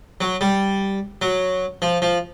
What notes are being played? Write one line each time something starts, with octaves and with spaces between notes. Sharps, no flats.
F#3
G3
F#3
F3
F3